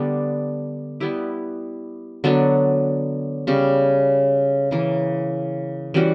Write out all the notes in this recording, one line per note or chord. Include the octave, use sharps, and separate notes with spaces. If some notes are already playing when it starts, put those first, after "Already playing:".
Already playing: D3 G3 B3 D4
G3 B3 E4 G4
D3 F#3 B3 D4
C#3 G3 C#4
C#3 E3 A#3
E3 G3 C#4 F#4